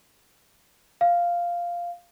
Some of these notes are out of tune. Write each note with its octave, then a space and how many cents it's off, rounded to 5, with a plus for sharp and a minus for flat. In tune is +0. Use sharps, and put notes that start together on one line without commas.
F5 -5